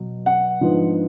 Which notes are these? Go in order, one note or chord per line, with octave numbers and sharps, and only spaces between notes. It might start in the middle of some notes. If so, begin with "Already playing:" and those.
Already playing: B2 F#3
F#5
G#2 F3 B3 D4